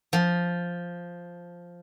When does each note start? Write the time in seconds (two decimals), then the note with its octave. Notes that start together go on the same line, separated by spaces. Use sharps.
0.13 F3